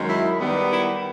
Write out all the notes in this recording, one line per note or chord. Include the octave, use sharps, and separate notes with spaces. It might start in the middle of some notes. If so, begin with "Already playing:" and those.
Already playing: F#2 D#3 G#3
E4
D#3 G3 B3
E4